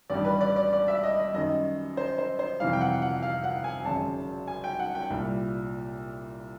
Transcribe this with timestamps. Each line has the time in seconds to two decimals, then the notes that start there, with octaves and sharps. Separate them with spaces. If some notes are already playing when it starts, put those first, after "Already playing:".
0.10 A1 G2 D#3 G3 D5
0.25 B4
0.41 D5
0.56 D5
0.72 D5
0.88 E5
1.03 D#5
1.19 D#5
1.34 F#2 D#3 G3 D#5
1.97 C5
2.18 C5
2.39 C5
2.60 F2 C3 E3 G3 F5
2.73 G5
2.81 F#5
3.02 F#5
3.23 F5
3.44 F#5
3.64 G#5
3.85 G#1 F#2 C#3 F#3 A5
4.48 G#5
4.64 G5
4.79 F#5
4.95 G5
5.10 C2 A#2 G3